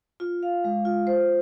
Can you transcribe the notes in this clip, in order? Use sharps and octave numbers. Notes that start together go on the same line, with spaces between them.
F4
F5
G#3
F4
C5